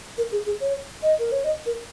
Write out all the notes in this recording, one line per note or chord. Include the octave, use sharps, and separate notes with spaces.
A#4
G#4
G#4
C#5
D#5
A#4
C#5
D#5
A#4